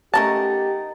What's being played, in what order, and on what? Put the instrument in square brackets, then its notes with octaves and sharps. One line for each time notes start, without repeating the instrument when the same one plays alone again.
[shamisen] A3 C#4 A5 [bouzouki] D#4 A#4 F#5 [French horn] G4 [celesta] A6